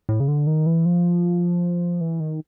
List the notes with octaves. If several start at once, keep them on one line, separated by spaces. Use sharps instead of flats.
A2
C#3
D3
D#3
E3
F3
E3
D#3